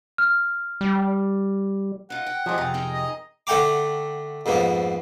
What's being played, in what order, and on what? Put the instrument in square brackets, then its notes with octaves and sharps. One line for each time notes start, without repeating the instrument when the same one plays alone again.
[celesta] F6
[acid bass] G3
[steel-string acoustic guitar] D#4 F4 [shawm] F#5
[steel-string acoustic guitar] G5
[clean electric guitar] F3 [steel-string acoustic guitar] G#3 E5 [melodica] C4 G4 G#4
[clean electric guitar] F2 C3 G5 [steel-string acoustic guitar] F4 [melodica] G#4 A#5
[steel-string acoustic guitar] C4 D#4 A#4
[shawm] D#5
[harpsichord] D3 A3 F#5 G5 A#5 D6
F2 G#2 A#3 B3